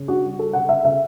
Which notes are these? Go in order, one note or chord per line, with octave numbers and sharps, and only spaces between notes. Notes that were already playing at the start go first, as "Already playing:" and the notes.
Already playing: C#3
D4 F#4
G3
G3 A4
C#3 F#5
C#3 E5
C#3 E5